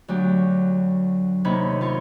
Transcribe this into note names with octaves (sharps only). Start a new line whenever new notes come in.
D2 F#3 G4
D#2 C3 D#4 A4 C#5 B5
F4 C#5 C6 C#6